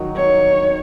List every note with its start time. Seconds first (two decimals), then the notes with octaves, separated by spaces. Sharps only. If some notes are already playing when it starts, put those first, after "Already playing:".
Already playing: D#3 F#3 D#4
0.16 C#5